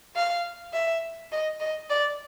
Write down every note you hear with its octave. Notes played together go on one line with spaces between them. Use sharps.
F5
E5
D#5
D#5
D5